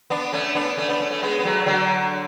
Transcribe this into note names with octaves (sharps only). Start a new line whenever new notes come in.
B3 D4
A3 C#4
B3 D4
A3 C#4
B3 D4
A3 C#4
A3 C#4
G#3 B3
B3
F#3 A3
D3 F#3